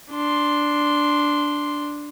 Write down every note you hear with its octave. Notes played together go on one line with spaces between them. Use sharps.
D4 C6